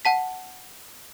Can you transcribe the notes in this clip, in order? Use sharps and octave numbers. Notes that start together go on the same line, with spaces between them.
F#5 A5 B6